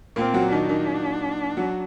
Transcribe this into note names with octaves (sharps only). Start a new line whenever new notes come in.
A#2 A#3 C4
F#3 F#4
D#3 D4 D#4
D#3 D#4
F#3 F#4